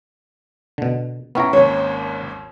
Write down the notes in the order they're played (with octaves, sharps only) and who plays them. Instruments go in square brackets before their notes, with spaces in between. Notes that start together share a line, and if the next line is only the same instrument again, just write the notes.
[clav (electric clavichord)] B2 D3
[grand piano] A2 [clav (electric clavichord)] B3 E4 A#5 [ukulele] C#4 G5
[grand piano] G#1 D#2 G#2 [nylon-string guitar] C#5